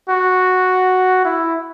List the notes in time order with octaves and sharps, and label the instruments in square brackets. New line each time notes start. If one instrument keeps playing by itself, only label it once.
[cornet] F#4
E4